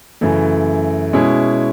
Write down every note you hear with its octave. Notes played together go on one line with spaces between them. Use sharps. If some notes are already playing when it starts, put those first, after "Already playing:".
F#2 C#3 E3 A3
B2 G#3 C#4 E4